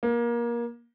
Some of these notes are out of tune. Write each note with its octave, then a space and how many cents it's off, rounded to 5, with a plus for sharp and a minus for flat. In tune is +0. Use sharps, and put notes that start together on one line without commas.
A#3 +25